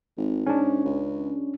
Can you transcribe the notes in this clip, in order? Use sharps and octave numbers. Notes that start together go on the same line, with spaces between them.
G#1
G#2 C#4 D4
C#2